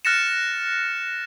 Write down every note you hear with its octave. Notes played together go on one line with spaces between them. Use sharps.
F6 F#6 A6 A#6 C#7 E7